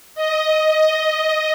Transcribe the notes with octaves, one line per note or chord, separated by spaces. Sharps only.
D#5